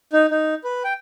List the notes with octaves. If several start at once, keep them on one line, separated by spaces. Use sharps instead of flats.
D#4
D#4
B4
G5